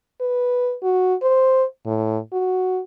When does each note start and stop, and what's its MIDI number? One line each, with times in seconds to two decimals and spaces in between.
0.21 0.75 71
0.83 1.15 66
1.22 1.64 72
1.86 2.18 45
2.33 2.81 66